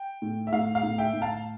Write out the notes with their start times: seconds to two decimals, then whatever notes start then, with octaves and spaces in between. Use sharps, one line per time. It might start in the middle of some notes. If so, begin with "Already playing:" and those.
Already playing: G5
0.22 A2
0.47 E5
0.52 A2 F5
0.75 F5
0.83 A2
0.98 E5 G5
1.13 A2
1.22 F5 A5